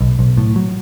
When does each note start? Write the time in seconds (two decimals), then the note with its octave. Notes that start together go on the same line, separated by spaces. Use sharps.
0.01 B1
0.19 B1
0.37 A2
0.56 F#3